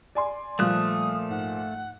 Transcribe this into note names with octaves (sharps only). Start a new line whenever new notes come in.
D5 G#5 C6
A#2 F3 G3 A3 D#6 F#6
G#2 F#5